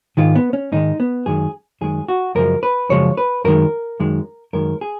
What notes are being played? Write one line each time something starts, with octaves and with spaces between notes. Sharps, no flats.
G#2 D#3 G#3 F4
B3
C#4
G#2 D#3 G#3 D#4
B3
F#2 D#3 G#3 G#4
F#2 D#3 G#3 G#4
F#4
F#2 C#3 F3 G#3 A#4
B4
F#2 C#3 F3 G#3 C#5
B4
F#2 D#3 G#3 A#4
F#2 D#3 G#3
F#2 D#3 G#3 A#4
G#4